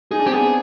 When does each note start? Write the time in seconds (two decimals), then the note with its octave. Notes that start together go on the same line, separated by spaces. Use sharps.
0.11 D#4 G#4
0.19 D4
0.26 C4 G4
0.33 B3 D4 G#4